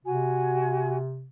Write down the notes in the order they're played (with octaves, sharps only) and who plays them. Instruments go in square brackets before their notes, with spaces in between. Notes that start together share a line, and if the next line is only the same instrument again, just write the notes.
[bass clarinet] C3 [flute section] F#4 G#5